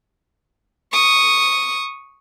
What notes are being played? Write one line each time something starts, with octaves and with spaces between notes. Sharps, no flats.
C#6 D#6